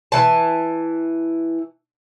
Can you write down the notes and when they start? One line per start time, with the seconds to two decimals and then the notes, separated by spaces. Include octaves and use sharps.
0.12 E3 A5